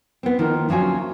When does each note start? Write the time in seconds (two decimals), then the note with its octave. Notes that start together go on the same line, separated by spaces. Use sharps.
0.23 B3 C4
0.39 D#3 F3 A#3 D#4
0.69 D2 F3 F#3 C#4 G#5